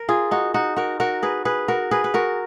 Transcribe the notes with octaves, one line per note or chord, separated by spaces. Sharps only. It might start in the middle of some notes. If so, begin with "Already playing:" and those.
Already playing: A#4
F4 G#4
D#4 F#4
D#4 F#4
F#4 A#4
F#4 A#4
G#4 B4
G#4 B4
F#4 A#4
G#4 B4
B4
F#4 A#4